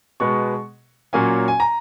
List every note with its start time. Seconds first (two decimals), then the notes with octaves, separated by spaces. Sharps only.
0.20 B2 G#3 B3 C#6
1.13 A#2 F#3 A#3 C#4 G#5
1.48 G#5
1.60 A#5